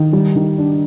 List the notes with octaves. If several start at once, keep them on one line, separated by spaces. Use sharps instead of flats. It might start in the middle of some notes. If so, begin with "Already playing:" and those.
Already playing: D#3
G3
D#3
D4